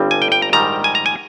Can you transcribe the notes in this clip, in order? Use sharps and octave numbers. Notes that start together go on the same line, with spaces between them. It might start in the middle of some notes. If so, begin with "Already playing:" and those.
Already playing: G1 G2 G3 C4
G#5
G5
G5
A#5
A#1 G#2 D#3 G3 A#5
G#5
A#5
G#5